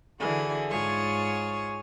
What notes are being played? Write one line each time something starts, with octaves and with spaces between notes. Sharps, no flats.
D3 E3 F#4 G#4
G#2 F4 G#4 C#5 C#6 A6